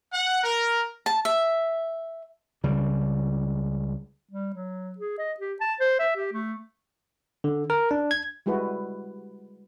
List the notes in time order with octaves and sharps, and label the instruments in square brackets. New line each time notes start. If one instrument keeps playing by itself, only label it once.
[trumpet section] F#5
A#4
[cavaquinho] A5
E5
[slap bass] C#2 C#3 G3
[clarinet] G3
F#3
G#4
D#5
G4
A5
C5
E5
G4
A3
[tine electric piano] D3
A#4
D4
G#6
[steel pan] G3 G#3 E4 F#4 B4